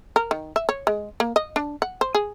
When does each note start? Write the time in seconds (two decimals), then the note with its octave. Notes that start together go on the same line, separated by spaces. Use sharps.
0.16 A#4
0.31 D#3
0.56 E5
0.69 C#5
0.87 G#3
1.20 A#3
1.36 D#5
1.56 D4
1.82 F#5
2.01 C5
2.15 G#4